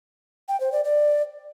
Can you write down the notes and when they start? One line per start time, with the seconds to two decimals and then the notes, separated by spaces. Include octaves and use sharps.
0.48 G5
0.60 C5
0.72 D5
0.84 D5